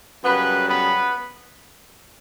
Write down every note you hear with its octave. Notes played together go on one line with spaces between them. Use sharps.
F#2 C#3 G3 B3 B4
B3 B4